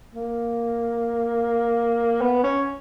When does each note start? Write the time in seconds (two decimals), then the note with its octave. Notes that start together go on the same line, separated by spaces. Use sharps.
0.15 A#3
2.21 B3
2.44 C#4